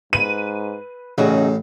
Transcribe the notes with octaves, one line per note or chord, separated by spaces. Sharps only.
G#2 B4 D#7
A1 A2 C#3 C#4 D#4 F#4